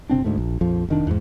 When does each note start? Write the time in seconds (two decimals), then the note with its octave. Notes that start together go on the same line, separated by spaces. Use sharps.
0.09 F#1 C3 C4 D4
0.24 D2 G#2 A3
0.37 A#1
0.61 A#1 F2 F3
0.88 F1 D#3 D4
1.07 E2 G#2